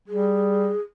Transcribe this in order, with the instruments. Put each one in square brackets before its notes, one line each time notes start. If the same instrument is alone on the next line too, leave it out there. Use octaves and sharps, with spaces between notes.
[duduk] G3 [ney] G#4